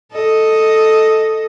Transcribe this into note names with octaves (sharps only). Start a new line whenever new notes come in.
A4 D#5